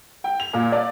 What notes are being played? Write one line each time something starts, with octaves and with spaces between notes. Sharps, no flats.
G5
F7
A#2
D5